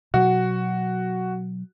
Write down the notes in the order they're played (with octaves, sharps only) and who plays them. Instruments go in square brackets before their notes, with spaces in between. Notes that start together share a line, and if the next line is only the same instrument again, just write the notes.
[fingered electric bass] B2 F#3 [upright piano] F#4